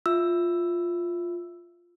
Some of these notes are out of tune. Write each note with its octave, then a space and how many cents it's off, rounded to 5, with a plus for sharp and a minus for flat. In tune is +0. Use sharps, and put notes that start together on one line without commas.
F4 +0 E5 +0 E6 +5